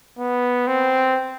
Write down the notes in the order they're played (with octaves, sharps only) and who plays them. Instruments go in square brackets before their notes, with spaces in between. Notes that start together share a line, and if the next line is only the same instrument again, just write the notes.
[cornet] B3
C4